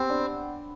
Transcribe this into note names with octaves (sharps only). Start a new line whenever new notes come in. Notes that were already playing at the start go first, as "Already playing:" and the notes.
Already playing: B3 C4 G4
D4